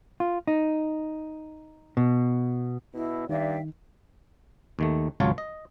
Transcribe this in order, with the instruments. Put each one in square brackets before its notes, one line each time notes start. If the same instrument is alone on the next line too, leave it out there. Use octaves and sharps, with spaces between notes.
[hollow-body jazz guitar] F4
D#4
B2
[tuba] B2 [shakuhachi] E4
[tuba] G2 [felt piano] D#3 [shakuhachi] D5 [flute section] E5 F5 G5
[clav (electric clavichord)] D#2 D#3 A3
G#1 C#2 F#3 F4 C#5 A5
D#5